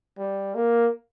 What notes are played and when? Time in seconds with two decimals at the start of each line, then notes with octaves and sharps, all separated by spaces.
0.18 G3
0.55 A#3